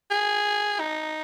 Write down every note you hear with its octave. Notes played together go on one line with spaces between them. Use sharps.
G#4
D#4